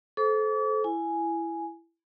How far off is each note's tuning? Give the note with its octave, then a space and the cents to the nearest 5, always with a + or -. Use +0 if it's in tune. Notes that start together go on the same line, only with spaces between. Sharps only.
A4 -25 C5 +0 D6 -40
E4 +15 G#5 +0